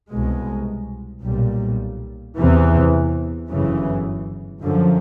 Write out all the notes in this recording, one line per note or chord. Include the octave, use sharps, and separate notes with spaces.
C2 B2 G#3
B1 A#2 G3
E2 C3 E3
G1 F#2 C#3 E3
F#2 D3 F3